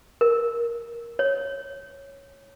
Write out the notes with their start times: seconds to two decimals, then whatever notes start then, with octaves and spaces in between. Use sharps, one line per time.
0.21 A#4
1.19 C#5